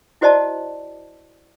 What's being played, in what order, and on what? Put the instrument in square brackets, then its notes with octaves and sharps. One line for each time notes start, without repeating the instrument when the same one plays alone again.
[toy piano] E4 F#4 C5 D5 D#5 A5